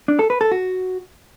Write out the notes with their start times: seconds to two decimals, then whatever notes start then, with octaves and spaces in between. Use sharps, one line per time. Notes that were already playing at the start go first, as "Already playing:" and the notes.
0.08 D4
0.19 A4
0.30 B4
0.41 A4
0.52 F#4